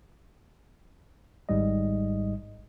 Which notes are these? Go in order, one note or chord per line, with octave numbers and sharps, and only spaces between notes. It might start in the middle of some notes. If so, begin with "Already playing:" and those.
G#1 G#2 G3 D#5